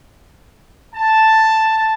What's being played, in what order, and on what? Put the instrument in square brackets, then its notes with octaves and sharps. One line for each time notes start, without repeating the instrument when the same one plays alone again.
[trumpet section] A5